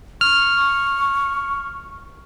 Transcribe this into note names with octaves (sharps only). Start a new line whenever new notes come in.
C#6 F6